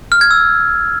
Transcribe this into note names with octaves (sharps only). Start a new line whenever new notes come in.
F6
G#6
E6